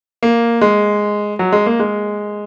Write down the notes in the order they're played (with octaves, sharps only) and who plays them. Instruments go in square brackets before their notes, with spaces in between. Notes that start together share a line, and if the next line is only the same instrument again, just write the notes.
[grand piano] A#3
G#3
F#3
G#3
A#3
G#3